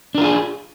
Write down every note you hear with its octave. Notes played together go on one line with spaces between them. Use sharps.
D4 F4 G#4 A#4